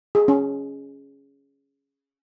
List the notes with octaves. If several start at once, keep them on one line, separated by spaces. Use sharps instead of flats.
G#4
C#4